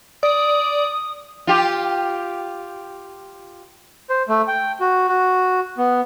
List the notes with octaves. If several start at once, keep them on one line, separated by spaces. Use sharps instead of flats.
D5 D#6
F4 G4
C5
A3
G5
F#4
F#4
B3